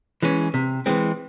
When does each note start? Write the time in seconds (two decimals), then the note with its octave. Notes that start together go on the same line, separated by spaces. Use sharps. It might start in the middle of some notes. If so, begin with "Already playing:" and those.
0.23 E3 G#3 C#4
0.54 C3
0.86 E3 G#3 C4